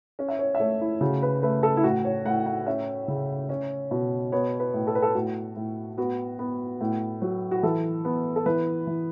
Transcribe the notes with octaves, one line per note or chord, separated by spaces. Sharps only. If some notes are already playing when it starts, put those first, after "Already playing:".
C#4
E5
C#5
E5
A3 C#5
E4
C#3 F#4
B4
A3 B4
A4
E4
A2 F#4
C#5
A2 F#5
F#5
C#4 E5
C#3
C#4
B2
B3 C#5
B4
A2
A4
B4
A4
A2 F#4
A2
B3 F#4
B3
A2
F#3
F#4
E3 A4
B3
A4
E3 B4
E3